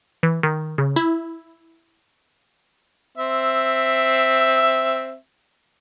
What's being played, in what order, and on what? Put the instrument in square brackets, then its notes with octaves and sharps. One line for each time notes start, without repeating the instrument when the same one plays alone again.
[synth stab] E3
D#3
C#3
E4
[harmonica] C4 E5